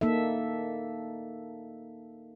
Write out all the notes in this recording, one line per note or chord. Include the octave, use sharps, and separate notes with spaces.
A#3 D#4 A4 E5